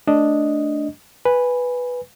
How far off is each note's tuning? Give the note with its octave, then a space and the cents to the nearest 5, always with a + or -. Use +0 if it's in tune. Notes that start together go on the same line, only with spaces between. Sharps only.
A3 +0 D4 +0 D#5 +0
B4 +0 G#5 -10